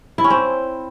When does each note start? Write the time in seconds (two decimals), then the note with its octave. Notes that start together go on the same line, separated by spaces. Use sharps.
0.18 E4
0.24 C#4
0.30 C4